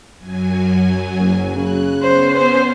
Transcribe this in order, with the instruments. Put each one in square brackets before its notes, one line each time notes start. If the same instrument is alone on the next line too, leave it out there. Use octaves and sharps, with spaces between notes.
[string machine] F#2 F#3 G#5
[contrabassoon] F#1
[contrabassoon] C#3 [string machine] F#6
[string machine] B3 C#4 [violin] C5
[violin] C5